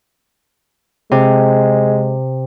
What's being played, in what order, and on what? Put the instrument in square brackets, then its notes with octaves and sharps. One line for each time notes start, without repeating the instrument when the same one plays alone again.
[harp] C3 [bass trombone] G#3